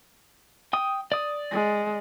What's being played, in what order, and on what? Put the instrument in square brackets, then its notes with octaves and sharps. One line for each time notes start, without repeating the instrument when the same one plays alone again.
[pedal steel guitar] G5 D#6
D5 D#6
[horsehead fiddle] G#3